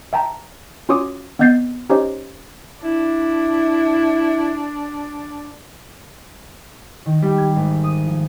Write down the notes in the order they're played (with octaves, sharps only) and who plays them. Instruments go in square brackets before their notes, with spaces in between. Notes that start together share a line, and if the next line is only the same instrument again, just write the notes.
[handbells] E5 G5 A5 A#5
C#4 F4 F#4 C#5 D6 D#6
B3 C4 D#5 G6 A6 C7
C#4 D#4 G4 C5 C#5 D#5
[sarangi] D4 [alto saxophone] E4
[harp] D#3
G3
G#6
G#1
D#6
F3